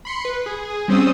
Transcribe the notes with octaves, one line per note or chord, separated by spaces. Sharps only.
B5 C6 C#7
B4
G#4
G#4
G3 C4 C#4 C5 D#6 E6